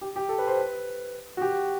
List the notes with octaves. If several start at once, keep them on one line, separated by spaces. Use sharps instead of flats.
G4
G4
A4
B4
C5
B4
F#4
G4